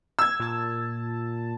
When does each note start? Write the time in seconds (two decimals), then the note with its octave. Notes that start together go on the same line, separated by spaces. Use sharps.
0.19 E6 G#6
0.40 A#2 A5